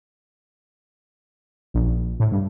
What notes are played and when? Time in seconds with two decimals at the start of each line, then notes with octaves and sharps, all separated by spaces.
1.74 A#1
2.20 A2
2.32 G2